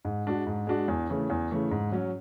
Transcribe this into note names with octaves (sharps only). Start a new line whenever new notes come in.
G#2
G#3 D4 F#4
G#2
G#3 D4 F#4
E2
C#3 E3 A3
E2
C#3 E3 A3
G#2
F#3 C#4